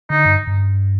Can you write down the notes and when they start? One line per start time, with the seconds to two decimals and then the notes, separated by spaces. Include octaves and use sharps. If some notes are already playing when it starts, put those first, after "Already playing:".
0.10 D3 D#4
0.25 G2
0.47 G2